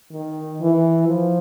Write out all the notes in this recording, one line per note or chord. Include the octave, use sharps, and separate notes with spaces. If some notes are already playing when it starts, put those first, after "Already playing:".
D#3
E3
F3